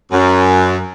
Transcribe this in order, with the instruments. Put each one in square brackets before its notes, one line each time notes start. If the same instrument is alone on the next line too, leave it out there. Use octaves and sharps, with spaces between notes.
[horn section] F#2